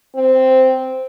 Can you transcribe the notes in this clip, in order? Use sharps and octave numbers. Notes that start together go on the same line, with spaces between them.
C4